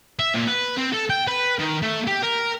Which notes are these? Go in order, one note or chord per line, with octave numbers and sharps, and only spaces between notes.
E5
A#2
B4
C4
A4
G5
B4
D#3
A3
G4
A#4